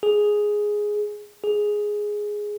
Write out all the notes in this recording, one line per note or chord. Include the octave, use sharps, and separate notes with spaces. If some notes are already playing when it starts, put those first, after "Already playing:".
G#4
G#4